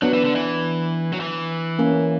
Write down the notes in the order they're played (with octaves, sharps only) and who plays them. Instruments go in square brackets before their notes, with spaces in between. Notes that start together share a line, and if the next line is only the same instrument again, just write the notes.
[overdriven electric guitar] F#3 [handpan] B3 D4
[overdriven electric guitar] E3
D3
E3
F#3
E3
[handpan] A#3 C#4